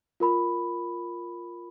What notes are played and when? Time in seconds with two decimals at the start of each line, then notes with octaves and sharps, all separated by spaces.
0.20 F4 A#4 B5